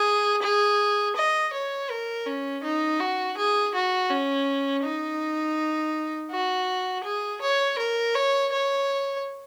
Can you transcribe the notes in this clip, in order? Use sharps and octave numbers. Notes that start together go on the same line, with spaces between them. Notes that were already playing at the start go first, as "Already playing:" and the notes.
Already playing: G#4
G#4
D#5
C#5
A#4
C#4
D#4
F#4
G#4
F#4
C#4
D#4
F#4
G#4
C#5
A#4
C#5
C#5